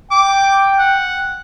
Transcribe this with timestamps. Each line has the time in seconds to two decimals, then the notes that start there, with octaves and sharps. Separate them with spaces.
0.11 G5 D6
0.79 F#5